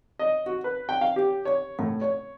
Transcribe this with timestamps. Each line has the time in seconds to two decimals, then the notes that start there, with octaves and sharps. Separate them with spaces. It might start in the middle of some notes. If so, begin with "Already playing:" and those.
0.19 D#5
0.46 F#4
0.64 B4
0.89 G5
1.01 F5
1.16 G4
1.45 C#5
1.79 A2
2.01 C#5